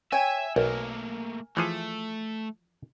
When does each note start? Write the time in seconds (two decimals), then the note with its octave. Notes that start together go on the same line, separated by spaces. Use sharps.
0.12 C#5 E5 G5 G#5
0.56 B1 A3 A#3 A#4
1.57 E3 F3 A3 G#4